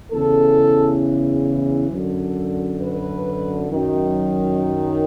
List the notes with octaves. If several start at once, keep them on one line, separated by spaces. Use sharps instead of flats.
E2 C#3 E3 A4
F#2 D3
B4
F#2 D#3